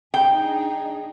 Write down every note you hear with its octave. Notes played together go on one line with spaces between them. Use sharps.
D4 D#4 G#4 G5